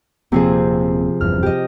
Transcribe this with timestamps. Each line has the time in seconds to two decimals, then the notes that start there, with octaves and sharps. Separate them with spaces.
0.32 D#1 C3 F3 A#3 C4 G#4
1.21 F#1 E2 G2 F6
1.43 G4 D#5